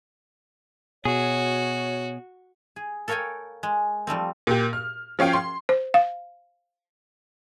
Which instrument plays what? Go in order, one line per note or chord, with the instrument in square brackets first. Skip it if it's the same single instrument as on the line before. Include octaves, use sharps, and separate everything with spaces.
[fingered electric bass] B2 [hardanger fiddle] F#4 [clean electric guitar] G#4 [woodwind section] C#5
[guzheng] G#4
A4 A#4 C#5 F5 G5 G#5
G#3
F3 G3 A3 C4
[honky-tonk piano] A#2 G4
F6
F3 C#4 F5 G5
C6
[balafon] C5
F5